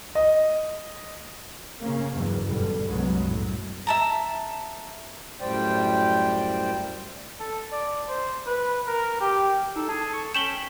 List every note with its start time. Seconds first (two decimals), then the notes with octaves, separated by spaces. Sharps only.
0.15 D#5
1.81 C#3 A#3 C#4
2.12 F#1 E2 G2
2.48 F#2 B2 D3 G3
2.87 C2 F#2 F#3 G#3 B3
3.24 A2 F#3
3.87 E5 A5 A#5
5.41 F#2 A2 G3 C5 D5 G5
7.40 A4
7.72 D5
8.08 C5
8.46 B4
8.87 A#4
9.21 G4
9.76 D#4 A4 E6
9.89 G#4 A5
10.13 C#6
10.35 C#4 G5 B6 E7 F#7 G7